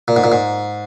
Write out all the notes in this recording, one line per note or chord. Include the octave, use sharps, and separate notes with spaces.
A#2
G#2
A#2
G#2